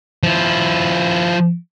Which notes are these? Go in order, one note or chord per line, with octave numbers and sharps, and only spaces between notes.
F3 E4